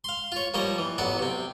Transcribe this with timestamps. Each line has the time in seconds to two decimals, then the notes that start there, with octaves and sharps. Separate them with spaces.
0.04 F5 C6
0.32 F4 C#5
0.54 F3 G3 A#3 C#5 D#5
0.78 E3
0.98 A1 F#3 B3 D5 F#5
1.19 C3 C4